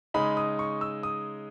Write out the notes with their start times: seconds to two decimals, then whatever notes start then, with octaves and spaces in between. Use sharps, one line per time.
0.14 C#3 G#3 D#4 B5
0.37 D#6
0.59 C#6
0.81 E6
1.03 D#6